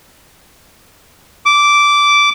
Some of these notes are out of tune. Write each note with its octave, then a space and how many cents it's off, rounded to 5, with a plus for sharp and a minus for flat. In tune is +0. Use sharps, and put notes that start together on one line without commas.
D6 -10